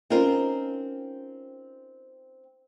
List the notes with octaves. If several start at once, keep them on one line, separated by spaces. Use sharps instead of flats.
C4 C#4 D#4 F4 A#4